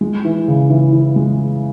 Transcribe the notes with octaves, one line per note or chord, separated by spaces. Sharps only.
G#3
E3
C#3
E3
E3
G#3